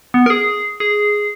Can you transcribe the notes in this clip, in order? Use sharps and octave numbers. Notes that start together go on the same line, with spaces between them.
B3
A#4
G#4
G#4